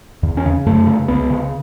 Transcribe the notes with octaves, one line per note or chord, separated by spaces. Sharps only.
E2
C#4
C#3
F#2 A3
C#3
C#2 B3
C#3